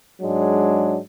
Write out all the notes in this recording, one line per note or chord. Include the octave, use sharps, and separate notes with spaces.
G#2 F#3 G#3 D4